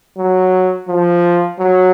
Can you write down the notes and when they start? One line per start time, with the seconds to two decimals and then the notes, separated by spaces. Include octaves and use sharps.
0.17 F#3
0.88 F3
1.59 F#3